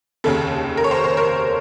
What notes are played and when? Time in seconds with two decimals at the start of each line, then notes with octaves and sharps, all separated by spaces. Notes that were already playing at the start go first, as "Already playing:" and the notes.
0.24 F1 D#2 C#3 A4
0.77 A#4
0.84 C#5
0.91 C5
1.04 C5
1.17 A#4